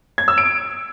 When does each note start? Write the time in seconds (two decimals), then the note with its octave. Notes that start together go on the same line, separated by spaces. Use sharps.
0.18 G#6
0.28 E6
0.38 D7